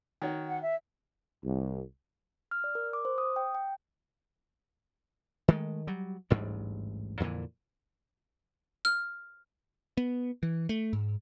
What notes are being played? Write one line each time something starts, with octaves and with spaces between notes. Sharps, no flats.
D#3 F#4 C#5
F#5
E5
C2
F6
D5
A#4
D6
C5
D#6
G5
G5
D#3 G#3 A3
F#3 G3
A1 D2 G#2 G3
F2 A#2 D3 E3
F6
B3
E3
A3
G#2